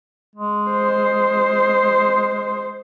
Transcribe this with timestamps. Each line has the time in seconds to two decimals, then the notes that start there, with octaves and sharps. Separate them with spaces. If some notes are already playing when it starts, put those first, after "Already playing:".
0.36 G#3
0.71 C5